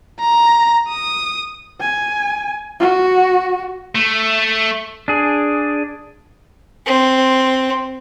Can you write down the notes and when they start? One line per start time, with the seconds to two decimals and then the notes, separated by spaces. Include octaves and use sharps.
0.20 A#5
0.89 D#6
1.80 G#5
2.80 F#4
3.95 A3
5.08 D4 G#4
6.86 C4